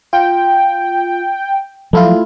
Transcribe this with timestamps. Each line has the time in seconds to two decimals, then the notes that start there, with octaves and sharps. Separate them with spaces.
0.13 F4 G5
1.93 F3 F#3 A3 E4 F4